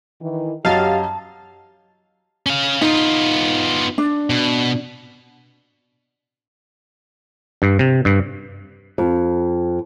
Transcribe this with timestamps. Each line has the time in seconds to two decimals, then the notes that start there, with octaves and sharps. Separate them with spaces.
0.21 D#3 E3
0.65 F#2 F#3 G4 D#5 F5 A5 A6
2.46 C#4 F5
2.81 B3 D#4 F4
3.98 D4
4.30 B2
7.62 G2
7.79 C3
8.05 G2
8.98 F2